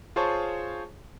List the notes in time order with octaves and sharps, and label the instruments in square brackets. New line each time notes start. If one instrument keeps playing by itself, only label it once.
[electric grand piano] F4 G#4 C5 C#5 A5 C#6